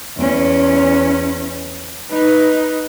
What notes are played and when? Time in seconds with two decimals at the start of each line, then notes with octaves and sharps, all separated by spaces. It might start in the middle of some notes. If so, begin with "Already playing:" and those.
0.17 E2 C#4
2.11 D#4 B4